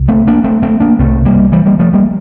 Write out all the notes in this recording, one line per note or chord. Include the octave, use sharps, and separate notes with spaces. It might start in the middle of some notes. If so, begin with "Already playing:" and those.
Already playing: C2
A3 C4
A#3 D4
A3 C4
A3 C4
A#3 D4
C2 C3 A3 C4
G3 A#3
E3 G3
G3 A#3
F3 A3
G3 A#3